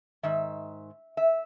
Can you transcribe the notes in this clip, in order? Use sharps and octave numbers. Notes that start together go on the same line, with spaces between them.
G#2 D#3 E5
E5